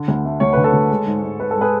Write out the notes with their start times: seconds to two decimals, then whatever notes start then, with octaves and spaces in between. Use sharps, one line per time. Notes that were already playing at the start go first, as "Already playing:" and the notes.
Already playing: D3
0.08 D2
0.25 A3
0.40 D2 C#5
0.53 D3 B4
0.64 A4 C#5
0.73 D2
0.90 G#3
1.07 G#2
1.23 G#2
1.40 G#3 B4
1.51 A4
1.56 G#3 G#4 B4